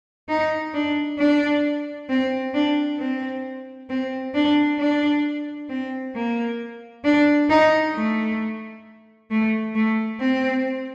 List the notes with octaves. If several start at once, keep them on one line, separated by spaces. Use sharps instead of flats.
D#4
D4
D4
C4
D4
C4
C4
D4
D4
C4
A#3
D4
D#4
A3
A3
A3
C4